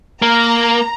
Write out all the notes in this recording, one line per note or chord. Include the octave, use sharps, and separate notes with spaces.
A#3 A#5